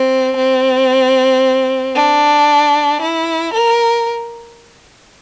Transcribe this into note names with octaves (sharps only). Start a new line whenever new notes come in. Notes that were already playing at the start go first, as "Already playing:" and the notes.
Already playing: C4
C4
D4
E4
A#4